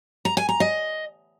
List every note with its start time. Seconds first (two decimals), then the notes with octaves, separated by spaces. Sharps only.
0.25 A#5
0.37 G#5
0.49 A#5
0.60 D#5